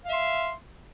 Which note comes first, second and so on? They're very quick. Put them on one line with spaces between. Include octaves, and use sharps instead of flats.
F5 E5 C6